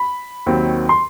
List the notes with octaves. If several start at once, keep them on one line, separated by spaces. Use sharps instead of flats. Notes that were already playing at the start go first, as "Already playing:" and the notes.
Already playing: B5
D#2 D#3 F#3 C4
C6